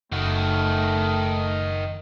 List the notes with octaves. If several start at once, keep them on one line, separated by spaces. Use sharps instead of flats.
F#1 D#3 A3 F#4